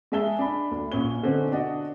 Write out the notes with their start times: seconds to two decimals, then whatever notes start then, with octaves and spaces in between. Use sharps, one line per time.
0.12 G#3 G#4 E5 A5 G7
0.39 D4 B5
0.71 D2
0.92 A#1 C#4 G7
1.22 B2 D3 C4 C#4
1.52 D4 F#4 D#5